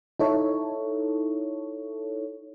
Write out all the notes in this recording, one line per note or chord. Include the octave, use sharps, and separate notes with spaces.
D#4 E4 A4 C#5